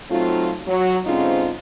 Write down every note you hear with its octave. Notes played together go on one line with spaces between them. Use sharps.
F#3 A3 C4 D#4 F4
F#3
G#2 D3 C4 C#4 D#4 F4